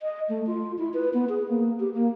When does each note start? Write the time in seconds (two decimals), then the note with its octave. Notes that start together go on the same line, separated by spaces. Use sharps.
0.01 D#5
0.29 A3
0.47 F4
0.78 E4
0.94 B4
1.14 B3
1.29 G#4
1.48 A#3
1.80 G4
1.94 A#3